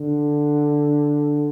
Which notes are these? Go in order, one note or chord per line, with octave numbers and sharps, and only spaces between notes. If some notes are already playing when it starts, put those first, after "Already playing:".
Already playing: D3